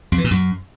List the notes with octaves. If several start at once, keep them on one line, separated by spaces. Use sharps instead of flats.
F2
E3
A#2
F#2